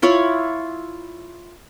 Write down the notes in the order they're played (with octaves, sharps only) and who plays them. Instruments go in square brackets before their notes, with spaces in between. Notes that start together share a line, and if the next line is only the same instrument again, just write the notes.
[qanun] E4 F4 C#5 B5